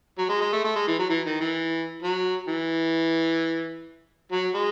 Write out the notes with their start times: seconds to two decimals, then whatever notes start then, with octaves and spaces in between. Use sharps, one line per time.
0.18 F#3
0.29 G#3
0.41 G#3
0.53 A3
0.65 A3
0.76 G#3
0.88 E3
0.99 F#3
1.10 E3
1.26 D#3
1.40 E3
2.03 F#3
2.48 E3
4.32 F#3
4.55 G#3